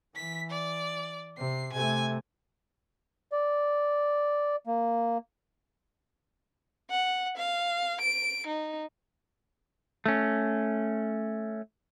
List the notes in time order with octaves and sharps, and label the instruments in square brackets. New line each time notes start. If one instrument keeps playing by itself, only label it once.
[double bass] E3 [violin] B6
[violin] D5
[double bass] C3 [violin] C7
[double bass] C3 A3 [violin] G#5
[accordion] D5
A#3
[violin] F#5
F5
D7
D#4
[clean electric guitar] A3 C#4